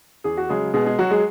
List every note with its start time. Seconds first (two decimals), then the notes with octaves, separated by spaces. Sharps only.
0.24 E2 G#4
0.37 F#4
0.49 C#3 F#3 G#3 G#4
0.74 B2 G#3 G#4
0.86 G#3 G#4
0.99 F#3 F#4
1.11 G#3 G#4